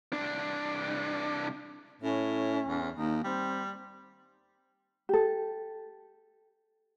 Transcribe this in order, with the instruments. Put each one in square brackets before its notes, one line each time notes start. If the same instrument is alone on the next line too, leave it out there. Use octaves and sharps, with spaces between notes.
[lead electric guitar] C2 D4
[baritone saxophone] A2 [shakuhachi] C#4
[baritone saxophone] E2
[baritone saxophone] D#2 [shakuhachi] D#4
[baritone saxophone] G3 [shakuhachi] C4
[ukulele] G4 A4